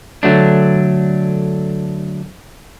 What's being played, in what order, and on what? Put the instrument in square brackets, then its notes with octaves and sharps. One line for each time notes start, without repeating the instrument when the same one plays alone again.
[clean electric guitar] D3 F#3 A3 D4